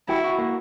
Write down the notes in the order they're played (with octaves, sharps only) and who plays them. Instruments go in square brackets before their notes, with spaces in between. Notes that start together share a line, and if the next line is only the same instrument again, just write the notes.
[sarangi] E4 [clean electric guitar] F#4
[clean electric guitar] F#4
A#3